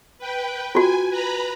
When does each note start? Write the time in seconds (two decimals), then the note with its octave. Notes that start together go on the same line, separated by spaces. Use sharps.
0.19 B4 G5
0.75 F4 F#4 G#5
1.09 B4 A#5 B5